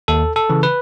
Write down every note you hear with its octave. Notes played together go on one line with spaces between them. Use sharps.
D#2 A4
A4
C#3 E3
B4